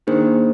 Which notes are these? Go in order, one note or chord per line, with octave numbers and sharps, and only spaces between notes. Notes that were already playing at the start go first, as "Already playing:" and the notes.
D#3 A#3 D4 G#4 C5